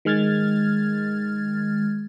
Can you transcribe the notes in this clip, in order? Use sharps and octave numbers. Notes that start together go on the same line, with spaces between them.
D#3 G#3 F6 G#6 A6